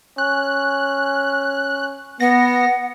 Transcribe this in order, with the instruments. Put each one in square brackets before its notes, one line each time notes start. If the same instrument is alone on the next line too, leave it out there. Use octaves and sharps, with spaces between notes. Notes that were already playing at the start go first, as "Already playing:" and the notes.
[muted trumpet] C#4 [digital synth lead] F#6
[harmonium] B3 [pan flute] F#5 [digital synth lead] A#6